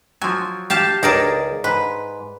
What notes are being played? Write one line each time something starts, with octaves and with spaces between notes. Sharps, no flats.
F3 F#3 G#5
G4 F5 A5
C#2 D#4 G#4 A#4 D5 A5
G#2 B4